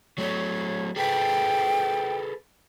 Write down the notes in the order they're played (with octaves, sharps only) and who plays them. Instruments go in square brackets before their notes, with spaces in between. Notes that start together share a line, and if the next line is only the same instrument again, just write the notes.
[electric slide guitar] F#3 A3 [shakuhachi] C#5
[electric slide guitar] G#4 A4 B4 [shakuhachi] G5